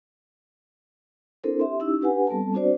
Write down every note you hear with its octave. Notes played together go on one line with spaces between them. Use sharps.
C4 D4 E4 A4 A#4 C5
G4 E5 C6
C#4 D#4 E4 G4 E6
D4 G4 B4 F#5 G#5
G3 B3 C4 A4 A5
C4 D4 F#4 C5 D5